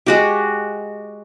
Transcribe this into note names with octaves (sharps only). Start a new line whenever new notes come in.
G#3 F#4 G4